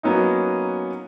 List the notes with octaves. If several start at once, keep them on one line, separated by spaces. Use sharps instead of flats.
F#3 A#3 B3 C#4 D#4